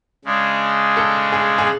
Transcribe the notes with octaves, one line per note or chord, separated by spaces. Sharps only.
C#3 G#3 D4
A4
G#4
G#4